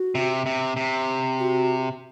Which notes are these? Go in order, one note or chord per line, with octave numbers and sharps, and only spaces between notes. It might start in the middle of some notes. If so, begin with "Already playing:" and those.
Already playing: F#4
C3
C3
C3
F#4